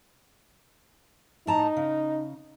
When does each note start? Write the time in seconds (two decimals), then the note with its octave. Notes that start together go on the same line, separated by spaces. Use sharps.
1.47 A2 D#4 A5 A#5
1.77 C#3